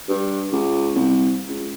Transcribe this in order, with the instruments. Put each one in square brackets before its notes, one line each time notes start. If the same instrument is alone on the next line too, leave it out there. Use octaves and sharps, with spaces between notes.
[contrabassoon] G2
C#2
C2
C#2